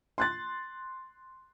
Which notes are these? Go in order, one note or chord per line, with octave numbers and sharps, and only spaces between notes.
C6 F#6 A6